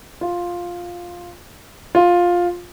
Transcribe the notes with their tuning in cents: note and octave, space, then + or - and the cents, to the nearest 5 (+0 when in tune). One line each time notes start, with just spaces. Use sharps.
F4 +5
F4 +10